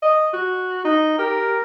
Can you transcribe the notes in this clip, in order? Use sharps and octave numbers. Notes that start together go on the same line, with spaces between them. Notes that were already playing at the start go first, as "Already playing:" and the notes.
D#5
F#4
D#4
G4 A#4